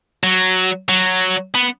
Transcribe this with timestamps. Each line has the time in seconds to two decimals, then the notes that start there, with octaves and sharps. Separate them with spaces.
0.23 F#3
0.89 F#3
1.54 B3